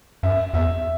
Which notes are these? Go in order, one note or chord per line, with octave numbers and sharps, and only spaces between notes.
F#2 E5
E2 E5